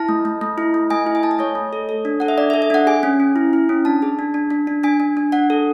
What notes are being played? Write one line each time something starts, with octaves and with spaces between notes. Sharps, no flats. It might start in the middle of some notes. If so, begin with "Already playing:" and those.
Already playing: E4 A5
A3
A3
A3
E4
A3
A3 G#5
E4
G#5
A3 A5
G#5
A3 C#5
A3
A4
A4
D4
A4 F#5
E5
D4 D5
E5
A4
E5
D4 F#5
G#4 G#5
C#4
C#4
E4
E4
C#4
D4 A5
G#4
D4
D4
D4
D4
D4 G#5
D4
D4
D4 F#5
A4